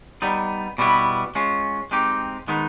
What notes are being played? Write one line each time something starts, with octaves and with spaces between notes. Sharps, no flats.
G3 B3 D#4
B2 G3 B3 E4
G#3 C#4 F4
G#3 C4 D#4 G4
D#3 G#3 B3 D#4